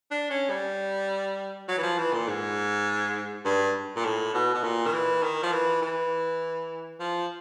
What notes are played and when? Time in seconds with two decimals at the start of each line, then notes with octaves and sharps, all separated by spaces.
0.11 D4
0.30 C#4
0.50 G3
1.68 F#3
1.78 E3
1.83 F3
1.98 E3
2.13 A#2
2.27 G#2
3.45 G2
3.96 A#2
4.05 A2
4.34 B2
4.54 B2
4.63 A#2
4.86 D#3
4.93 E3
5.23 D#3
5.43 F3
5.52 E3
5.82 E3
7.00 F3